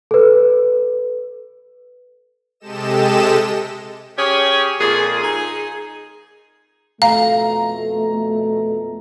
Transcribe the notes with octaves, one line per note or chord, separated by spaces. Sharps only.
A4 B4
C3 G#3 G4 A4 D#5 E7
C#4 G4 G#4 C#5
F2 A#2 F4 G#4
D#4 G#4
F2 B2 A3 F5 A#5